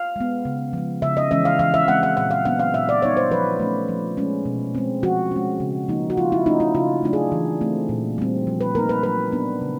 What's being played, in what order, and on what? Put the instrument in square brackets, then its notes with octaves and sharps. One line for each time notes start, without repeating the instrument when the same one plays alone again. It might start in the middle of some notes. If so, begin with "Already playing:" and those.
Already playing: [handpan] F5
G#3 B3
C#3
F3 G#3
C#3 E5
D#5
E3 G#3 C#4 E5
F5
E3 F5
E5
G#3 C4 F#5
F#5
A#2 F#5
F5
F#3 B3 D4 F#5
F5
A#2 E5
D5
G3 B3 D#4 C#5
C5
F3 B4
A3 C#4
F3
G#3 C#4
B2
G#3 C4
F3 F#4
G#3 C#4
C#3
F3 A#3 D#4
F#4
F3 F4
E4
A3 C#4 D#4
E4
C#3 F4
F#3 A3 D4
G#4
E3
A3 C4
A#2
G3 C4
F3
B4
A#3 D#4 A#4
B4
F#3 B4
B3 D4
C#3